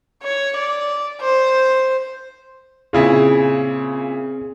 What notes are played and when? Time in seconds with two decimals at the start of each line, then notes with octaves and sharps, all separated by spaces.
0.23 C#5
0.56 D5
1.21 C5
2.93 A#2 C#3 C4 E4 G#4